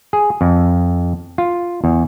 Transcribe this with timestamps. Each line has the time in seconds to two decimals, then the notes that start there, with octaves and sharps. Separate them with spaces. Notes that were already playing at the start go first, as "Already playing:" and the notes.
0.13 G#4
0.41 F2
1.38 F4
1.84 E2